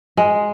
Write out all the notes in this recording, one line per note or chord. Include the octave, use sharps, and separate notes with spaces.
G#3